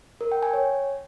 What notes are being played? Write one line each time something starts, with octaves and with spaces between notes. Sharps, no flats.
A#4
G5
G#5
C#5